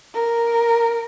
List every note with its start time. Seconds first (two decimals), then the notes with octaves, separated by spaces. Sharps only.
0.14 A#4